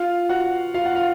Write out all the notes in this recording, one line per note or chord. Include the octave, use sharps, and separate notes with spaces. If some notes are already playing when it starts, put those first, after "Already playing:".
Already playing: F4 F5
F#4 F#5
F4 F5
F#5
F5